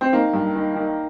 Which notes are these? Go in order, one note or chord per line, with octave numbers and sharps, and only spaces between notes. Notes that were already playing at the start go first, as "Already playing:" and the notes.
C4
D#3 A#3
G2
D#3
D#3